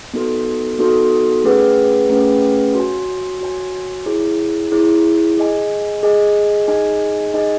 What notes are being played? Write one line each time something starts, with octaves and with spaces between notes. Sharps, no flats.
B3 D#4 F#4 A4
B3 D#4 F#4 A4
A3 C#4 G#4 B4 F#5
A3 C#4 G#4 B4 F#5
F#4 C#5 G#5
F#4 C#5 G#5
E4 G#4 C#5
E4 G#4 C#5
G#4 D#5 G#5
G#4 D#5 G#5
D#4 G#4 D#5 G#5
D#4 G#4 D#5 G#5